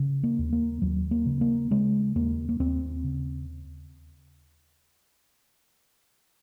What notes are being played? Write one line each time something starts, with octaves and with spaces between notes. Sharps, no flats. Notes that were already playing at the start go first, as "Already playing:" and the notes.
Already playing: C#3
A#3
D#2
A#3
D#2 F#3
A#3
C#3
A#3
C#3 G#3
D#2 A#3
A#3
D#2 C4
C#3